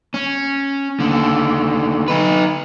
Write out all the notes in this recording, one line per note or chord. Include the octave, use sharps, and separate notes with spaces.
C#4
D#2 D3
D#4 B4